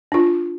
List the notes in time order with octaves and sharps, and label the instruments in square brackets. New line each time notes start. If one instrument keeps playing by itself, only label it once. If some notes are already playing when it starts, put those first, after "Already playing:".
[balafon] D4 F4